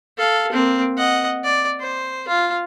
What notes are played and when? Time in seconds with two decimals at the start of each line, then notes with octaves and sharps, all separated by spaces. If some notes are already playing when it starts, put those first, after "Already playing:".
0.17 A4 F5
0.52 A#3 C4
0.97 D#5 F#5
1.44 D5
1.80 C5
2.28 F4